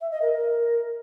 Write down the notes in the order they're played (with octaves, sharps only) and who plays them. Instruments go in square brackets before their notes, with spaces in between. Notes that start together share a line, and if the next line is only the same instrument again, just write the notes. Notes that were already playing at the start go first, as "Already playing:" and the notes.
[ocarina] E5
D#5
A#4
A#4